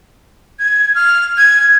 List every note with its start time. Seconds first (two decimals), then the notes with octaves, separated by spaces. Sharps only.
0.59 G#6
0.95 F6
1.38 G#6